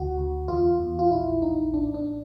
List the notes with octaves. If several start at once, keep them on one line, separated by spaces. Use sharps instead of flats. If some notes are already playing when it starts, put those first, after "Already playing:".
Already playing: D2 F#4
D2
E2 F4
E2
F4
A#1 E4
A#1 D#4
A1 D4
D4